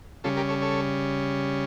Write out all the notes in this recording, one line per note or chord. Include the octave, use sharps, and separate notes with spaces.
C#3 G3 C#4 F4 A4
G4 A#4
A4 C#5
A4 C#5